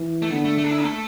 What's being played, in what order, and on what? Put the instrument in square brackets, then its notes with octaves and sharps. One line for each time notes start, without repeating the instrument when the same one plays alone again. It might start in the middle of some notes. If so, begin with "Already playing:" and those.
Already playing: [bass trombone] E3
[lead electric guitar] A3
[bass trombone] D3 [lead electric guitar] B3
[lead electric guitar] A3
A3
D4
E4
A3